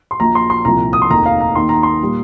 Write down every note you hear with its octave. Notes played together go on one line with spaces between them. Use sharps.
C6
A#1 A#2 F3 A#5
C6
C6
C2 A#2 F3 A#5
D#6
C6
F1 D#2 D#3 A#5
F5
A#5
D#2 D#3 A#3 C6
A#5
C6
A#2 G3 A#3